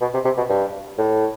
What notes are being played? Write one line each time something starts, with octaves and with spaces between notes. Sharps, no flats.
B2
C3
C3
B2
G2
A2